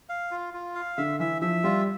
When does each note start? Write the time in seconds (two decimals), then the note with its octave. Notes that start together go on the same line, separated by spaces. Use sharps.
0.09 F5
0.31 F4
0.54 F4
0.75 F5
0.98 D3 E5
1.19 E3 E5
1.41 F3 E5
1.64 G3 F4